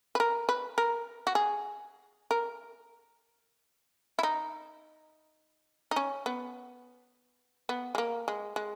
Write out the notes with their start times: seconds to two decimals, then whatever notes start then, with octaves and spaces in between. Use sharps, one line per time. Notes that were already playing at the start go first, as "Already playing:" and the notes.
0.15 B4
0.20 A#4
0.49 B4
0.78 A#4
1.27 F#4
1.35 G#4
2.31 A#4
4.19 E4
4.23 D#4
5.91 D#4
5.96 C#4
6.26 B3
7.69 B3
7.95 G#3
7.98 A#3
8.28 G#3
8.56 G#3